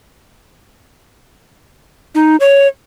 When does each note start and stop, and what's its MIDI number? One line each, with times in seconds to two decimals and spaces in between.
2.15 2.36 63
2.40 2.67 73